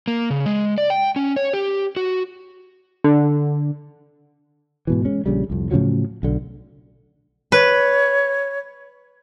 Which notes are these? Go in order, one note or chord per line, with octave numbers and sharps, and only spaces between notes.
A#3
C#3
G#3
D5
G5
C#4
C#5
G4
F#4
D3
G#2 B2 E3
G#3 C#4
A#1 C#3 G3
C2 F2
A2 C#3 F3 F#3
B1 D3
B4 C#5